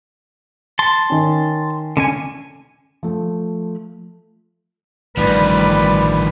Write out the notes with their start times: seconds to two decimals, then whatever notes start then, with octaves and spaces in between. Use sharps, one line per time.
0.79 A5 C6
1.10 D#3 C#4
1.97 D3 C#4 G#5
3.03 F3 A3
5.17 A1 D#3 F3 G3 B4